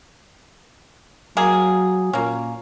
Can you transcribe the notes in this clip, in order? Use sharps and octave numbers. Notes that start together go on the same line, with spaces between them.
F#3 A#3 G#4
A#2 A#3 C#4